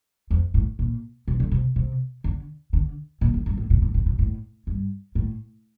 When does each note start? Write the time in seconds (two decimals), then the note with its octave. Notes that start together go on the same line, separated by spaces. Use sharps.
0.31 F2
0.54 A2
0.79 A#2
1.28 C3
1.40 D3
1.51 C3
1.76 C3
2.24 D3
2.73 D3
3.21 A#2
3.34 A2
3.46 G2
3.57 A2
3.70 A#2
3.82 A2
3.94 A#2
4.06 A#2
4.19 A2
4.67 G2
5.15 A2